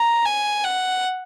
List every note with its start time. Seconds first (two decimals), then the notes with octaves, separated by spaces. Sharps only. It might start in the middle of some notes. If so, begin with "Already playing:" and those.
Already playing: A#5
0.25 G#5
0.64 F#5